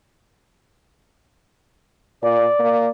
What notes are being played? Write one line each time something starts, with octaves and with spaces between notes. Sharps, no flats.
A#2 D5
A#3